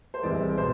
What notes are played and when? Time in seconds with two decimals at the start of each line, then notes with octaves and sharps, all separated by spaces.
0.14 C5
0.23 C2 C3 E3 G#3 D5
0.58 B2 C5